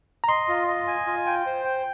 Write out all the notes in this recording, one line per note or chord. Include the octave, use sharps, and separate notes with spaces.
A#5
D#5 C6
F4
D#5
G#5
F4
G5
C5
G5